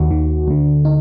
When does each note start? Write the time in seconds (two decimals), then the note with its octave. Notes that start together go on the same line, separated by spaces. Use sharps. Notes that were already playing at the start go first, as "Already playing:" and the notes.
Already playing: D#2 D#3 F#4
0.11 D#2 D#3
0.48 D2 D3
0.85 D#4